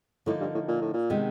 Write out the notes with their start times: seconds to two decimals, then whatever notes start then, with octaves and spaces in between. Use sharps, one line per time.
0.26 A2 D3 F3 A#3 D#4
0.40 G2
0.54 A2
0.68 A#2
0.81 A2
0.93 A#2
1.10 C3 D#3 G#3 B3